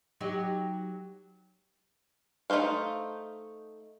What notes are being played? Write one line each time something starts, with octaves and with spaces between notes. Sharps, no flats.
F#3 D#4 G4
A3 D#4 F#4 C5 F5